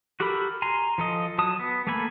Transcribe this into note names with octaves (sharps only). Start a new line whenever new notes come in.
F#4 G4 A4 A#4 B5
G#5 A#5 C6
F3 A4 D#5
F#3 A5 D#6
B3
A3 A#3 A4 G#5 B5